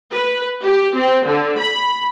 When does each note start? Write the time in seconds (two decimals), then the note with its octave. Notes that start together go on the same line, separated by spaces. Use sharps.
0.12 B4
0.63 G4
0.96 C4
1.26 D3
1.59 B5